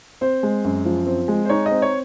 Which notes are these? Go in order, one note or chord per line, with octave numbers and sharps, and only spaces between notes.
C4 C5
G#3
F#2
F3
C4
G#3
C5
D#4 C#5
D#5
C4
C#5